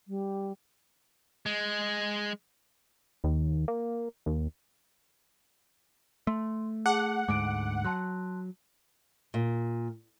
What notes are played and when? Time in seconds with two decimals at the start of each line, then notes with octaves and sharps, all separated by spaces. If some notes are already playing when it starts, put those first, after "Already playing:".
0.07 G3
1.46 G#3
3.24 D#2
3.68 A#3
4.26 D#2
6.27 A3 C6
6.86 G#4 F#5 A5 D6
7.28 D2 G#2 G#3 D6 D7
7.84 F#3 A5 C6 F#6
9.34 A#2